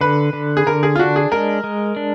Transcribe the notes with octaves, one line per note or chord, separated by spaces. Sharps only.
D3 B4
D3
G#4
D3 A#4
G#4
F4
D4 F#4
G#4
G#3 A#4
G#3
D4